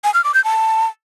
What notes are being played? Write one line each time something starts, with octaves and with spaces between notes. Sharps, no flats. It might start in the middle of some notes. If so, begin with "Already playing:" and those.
G#5
F6
D6
G6
A5